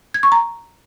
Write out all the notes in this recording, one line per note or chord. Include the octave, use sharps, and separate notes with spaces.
G#6
C#6
A#5